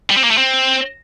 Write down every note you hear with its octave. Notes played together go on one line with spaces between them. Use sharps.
G3
C4
A#3
A3
C4